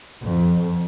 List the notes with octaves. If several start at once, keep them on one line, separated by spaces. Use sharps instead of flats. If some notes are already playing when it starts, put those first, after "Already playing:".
F2